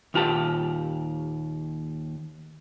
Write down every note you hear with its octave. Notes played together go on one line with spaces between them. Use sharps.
D#2 A#2 F4 G4 F#5 A5